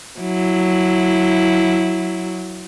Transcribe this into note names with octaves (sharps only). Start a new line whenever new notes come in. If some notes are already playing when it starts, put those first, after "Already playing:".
F#3 E4